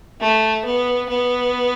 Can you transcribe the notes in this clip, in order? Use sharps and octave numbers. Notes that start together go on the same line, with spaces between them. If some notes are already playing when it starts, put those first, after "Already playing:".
A3
B3
B3